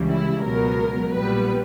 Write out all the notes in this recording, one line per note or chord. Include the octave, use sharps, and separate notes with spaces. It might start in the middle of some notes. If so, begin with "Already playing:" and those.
Already playing: C#2 C#3 E3 G3
E4
C#2 B2 F#3 B3 A#4
A#1 A#2 G3 B3 B4